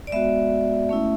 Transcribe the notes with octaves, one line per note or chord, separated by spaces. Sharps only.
D5
G#3 B3 F#4 E5
A3 C#4 E4